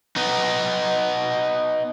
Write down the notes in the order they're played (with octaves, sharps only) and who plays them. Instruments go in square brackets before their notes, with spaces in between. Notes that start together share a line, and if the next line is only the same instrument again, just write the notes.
[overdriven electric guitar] B3 D#4